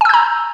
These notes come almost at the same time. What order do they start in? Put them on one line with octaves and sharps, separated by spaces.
G#5 E6 G6 A#5